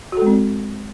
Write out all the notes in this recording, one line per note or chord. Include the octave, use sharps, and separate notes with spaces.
G#3 C4 F#4 A4